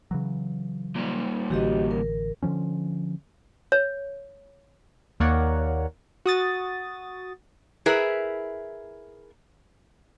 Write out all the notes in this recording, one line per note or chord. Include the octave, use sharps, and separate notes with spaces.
C#3 E3 F#3
A#2 G3
A1 D3 E3 F#4 G4 D#5
A#4
D3 D#3 F3 C#4
C#5
D#2 A#3 A#4 C#5 D5 F#5
F#4 D#6 A6
E4 G#4 A#4 B4 E5